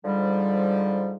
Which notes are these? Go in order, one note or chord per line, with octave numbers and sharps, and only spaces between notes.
G#2 D3 F3 G3